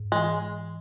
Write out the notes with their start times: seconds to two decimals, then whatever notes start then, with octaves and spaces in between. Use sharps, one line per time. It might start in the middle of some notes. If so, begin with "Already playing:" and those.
Already playing: G#2
0.12 E3 G#3